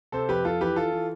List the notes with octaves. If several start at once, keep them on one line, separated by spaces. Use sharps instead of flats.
C3 A4 C5
F2 G4 B4
F2 F4 A4
E3 G4 B4
E3 F4 A4
E3